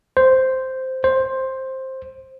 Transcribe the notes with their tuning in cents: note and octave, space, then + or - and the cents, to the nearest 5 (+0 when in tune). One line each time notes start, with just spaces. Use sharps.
C5 -5
C5 +10